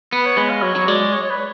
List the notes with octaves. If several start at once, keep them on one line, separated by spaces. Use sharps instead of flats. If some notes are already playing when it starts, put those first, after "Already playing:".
B3 B4
C#5
G#3 B4
F5
F#3 C#5
F#3
G#3 D5
C#5
C#5
B4